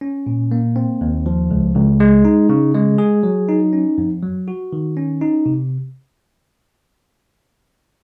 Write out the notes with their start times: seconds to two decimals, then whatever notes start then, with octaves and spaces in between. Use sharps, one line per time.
0.01 C#4
0.26 A#2
0.51 A#3
0.76 C4
1.01 D#2
1.26 F3
1.51 C#2
1.75 C#2
2.00 G#3
2.25 D#4
2.49 C#3
2.74 G#3
2.98 G#4
3.23 F#3
3.49 D#4
3.73 C#4
3.98 F2
4.23 F#3
4.48 F#4
4.73 D#3
4.97 C#4
5.21 D#4
5.46 C3